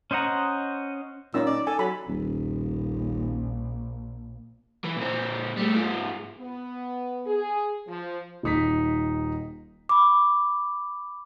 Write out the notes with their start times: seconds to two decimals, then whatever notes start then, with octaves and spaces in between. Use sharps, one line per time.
0.11 C#4 C5 D#5 F#5 A#5
1.34 A#2 C#4 D#4 E6
1.47 D5
1.67 A4 G#5
1.79 F#3 B5
2.08 D#1 A#1
4.84 E3
4.97 A#2 C4
5.57 G3 A3
5.76 G#2 F4
6.38 B3
7.26 G#4
7.88 F3
8.43 D#1 D#4 B6
9.89 B5 D6